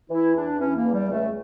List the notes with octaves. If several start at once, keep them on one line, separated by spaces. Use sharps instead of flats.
E3 E4
E2 D4
E3 C#4
A#3
E2
G3
C#2 A3